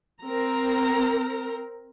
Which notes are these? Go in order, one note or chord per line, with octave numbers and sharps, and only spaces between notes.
C4 A#4 A#5